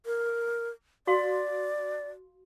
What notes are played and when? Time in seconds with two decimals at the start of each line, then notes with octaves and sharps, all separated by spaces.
0.06 A#4
1.07 F#4 D5 F5 C6